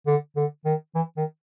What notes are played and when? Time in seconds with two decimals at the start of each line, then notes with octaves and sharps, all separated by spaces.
0.07 D3
0.37 D3
0.65 D#3
0.95 E3
1.17 D#3